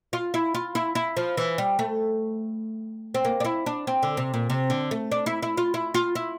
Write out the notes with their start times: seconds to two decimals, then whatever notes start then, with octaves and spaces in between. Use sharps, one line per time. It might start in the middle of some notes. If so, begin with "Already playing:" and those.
0.13 F4
0.34 E4
0.54 F4
0.75 E4
0.95 E4
1.17 F3
1.37 E3
1.58 G3
1.79 A3
3.14 C4
3.25 A#3
3.40 D4
3.45 E4
3.66 D4
3.87 C4
4.03 D3
4.17 C3
4.34 A#2
4.50 C3
4.70 D3
4.91 A3
5.12 D4
5.26 E4
5.42 E4
5.57 F4
5.74 E4
5.94 F4
6.15 E4